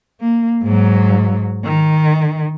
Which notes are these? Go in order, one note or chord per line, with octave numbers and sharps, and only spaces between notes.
A#3
G#2 F#3
D#3